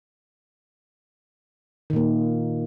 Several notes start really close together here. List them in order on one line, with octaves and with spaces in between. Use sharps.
D#3 A#2 A#3